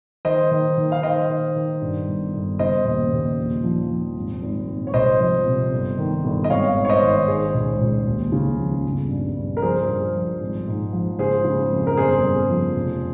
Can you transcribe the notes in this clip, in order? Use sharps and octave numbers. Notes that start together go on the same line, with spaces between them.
D#3 C5 D#5
D#3
D#3
F5
D#3 C5 D#5
D#3
D#3
G2
G1
G1
C#3 C5 D#5
D#2
D#2
A#1
F3
F3
G#1
G#1
G#1
C#5
C2 C5 D#5
F3
C3
G1
D#3
G1
D#5
G#1 C#5 F5
G#1
C#5
C5 D#5
D#3
D#3 G#4 C5
C#2
C#2
D#2
C#3
F3
G1
G2
G2
A#4
F3 G#4 C5
G2
F3
G#1
G#2
F3
C#3 G#4 C5
C#3
F2
A#4
G1 G#4 C5
G1
F3
F1